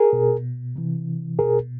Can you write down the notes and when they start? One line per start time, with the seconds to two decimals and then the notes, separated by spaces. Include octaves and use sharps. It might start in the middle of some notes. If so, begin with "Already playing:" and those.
Already playing: G#4 A#4
0.13 B2
0.76 C3 E3
1.38 B2 G#4 A#4